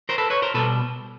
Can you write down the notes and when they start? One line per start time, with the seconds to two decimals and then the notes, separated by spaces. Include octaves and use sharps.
0.09 A#4 C5
0.18 A4 B4
0.30 B4 C#5
0.42 A#4 C5
0.54 B2 G3 A4 B4